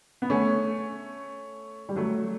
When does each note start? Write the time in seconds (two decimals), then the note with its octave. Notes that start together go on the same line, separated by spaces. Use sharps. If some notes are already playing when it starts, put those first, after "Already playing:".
0.22 B3
0.30 A3 C#4
1.89 G3
1.96 F#3 A3